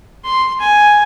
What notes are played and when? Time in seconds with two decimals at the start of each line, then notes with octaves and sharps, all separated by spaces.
0.25 C6
0.60 G#5